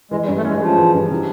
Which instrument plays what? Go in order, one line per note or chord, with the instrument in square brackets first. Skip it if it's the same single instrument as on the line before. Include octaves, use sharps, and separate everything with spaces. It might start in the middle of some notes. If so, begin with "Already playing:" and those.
[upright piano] E3 [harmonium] G#3
[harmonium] G3
[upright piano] G2
[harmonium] A3
[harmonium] G#3 [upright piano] C#4
[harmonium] F3 [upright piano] G#3
[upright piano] E3
G2
C3